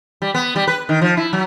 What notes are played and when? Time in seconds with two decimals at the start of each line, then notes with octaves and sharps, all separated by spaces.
0.22 G3
0.35 B3
0.56 G3
0.67 B4
0.89 D#3
1.02 F3
1.17 E4
1.33 F#3